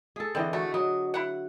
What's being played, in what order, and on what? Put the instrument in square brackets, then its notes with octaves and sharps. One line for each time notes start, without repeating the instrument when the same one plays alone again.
[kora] G#4 A4
[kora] D3 E3 D#5 [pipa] C4
[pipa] A3 [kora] F#4
[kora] F#3 [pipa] D#5
[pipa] E4 F#5